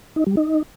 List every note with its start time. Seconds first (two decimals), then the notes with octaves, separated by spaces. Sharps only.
0.16 D#4
0.27 G3
0.37 D#4